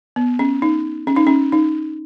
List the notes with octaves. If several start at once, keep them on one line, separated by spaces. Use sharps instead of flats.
B3
C#4
D#4
C#4
D#4
C#4
D#4